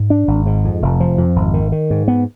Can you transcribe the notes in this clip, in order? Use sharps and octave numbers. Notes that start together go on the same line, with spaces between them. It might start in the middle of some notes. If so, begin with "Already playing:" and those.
Already playing: G#2
D4
G#1
G#2
F2
F1
F3
F2
G#1
D#3
D#3
G#2
B3